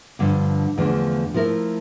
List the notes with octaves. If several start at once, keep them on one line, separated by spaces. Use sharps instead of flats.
G2 D3 F3
E2 D3 F3 A3
F3 A3 E4 A#4